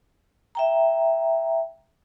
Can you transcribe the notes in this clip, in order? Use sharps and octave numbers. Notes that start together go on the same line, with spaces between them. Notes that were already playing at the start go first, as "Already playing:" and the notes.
E5 G5 A#5